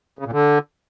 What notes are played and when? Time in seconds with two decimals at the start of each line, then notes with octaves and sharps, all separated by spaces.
0.19 C#3
0.26 A#2
0.32 D3